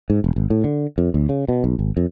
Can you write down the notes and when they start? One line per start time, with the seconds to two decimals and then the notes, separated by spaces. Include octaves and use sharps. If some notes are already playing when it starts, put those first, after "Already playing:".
0.10 G#2
0.24 E1
0.36 G#1
0.50 A2
0.64 D3
0.98 F2
1.14 D2
1.29 C#3
1.48 B2
1.64 B1
1.79 G#1
1.97 F2